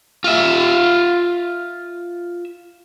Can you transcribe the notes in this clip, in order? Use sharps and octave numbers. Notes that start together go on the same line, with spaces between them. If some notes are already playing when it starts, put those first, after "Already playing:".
F4 E5